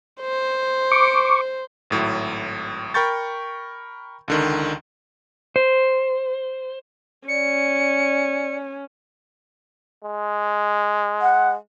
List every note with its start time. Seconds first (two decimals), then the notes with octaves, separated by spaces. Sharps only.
0.21 C5
0.92 C#6 D6
1.90 G#1 A2 F#3
2.94 A#4 G5 B5 C#6 G6 A6
4.28 C#2 D3 D#3
5.56 C5
7.28 C#4 D5 C#7
10.04 G#3
11.21 F#5